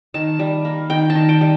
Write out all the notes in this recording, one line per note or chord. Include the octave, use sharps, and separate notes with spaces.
D#3 A5
G3
A#3
D#3 G5
A5
D#3
G5
G3